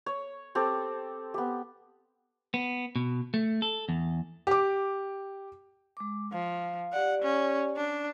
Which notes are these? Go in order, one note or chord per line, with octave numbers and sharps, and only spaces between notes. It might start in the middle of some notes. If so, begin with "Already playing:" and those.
C#5
C4 G4 A4
B3 G4
B3
B2
A3
A4
E2
G4 D6
G#3 D6
F3 F5
G4 D5 F#5
C#4
D4